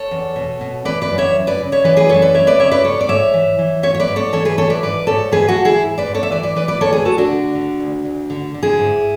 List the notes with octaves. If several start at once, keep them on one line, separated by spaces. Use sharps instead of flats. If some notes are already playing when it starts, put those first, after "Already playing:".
Already playing: A4 C#5
E2
B2
B2
E3 B4 D5
B4 D5
F#2
C#5 E5
F#2
B4 D5
C#3
C#5 E5
E3 B4 D5
G#4 B4
F#2 A4 C#5
B4 D5
F#2 C#5 E5
B4 D5
C#3 C#5 E5
B4 D5
G#2 A4 C#5
D5
G#2 C#5 E5
E3
E3
G#2 C#5 E5
C#5
B4 D5
G#2
A4 C#5
E3 A4 C#5
G#4 B4
E3 A4 C#5
B4 D5
G#2 B4 D5
G#2 A4 C#5
E3 G#4 B4
F#4 A4
E3
E4 G#4
G#2
B4 D5
G#2
A4 C#5
E5
E3 B4 D5
B4 D5
E3 B4 D5
B4 D5
D2 A4 C#5
G#4 B4
D2 F#4 A4
D4 F#4
D3
D3
D2
D2
D3
D3
E4 G#4
G#2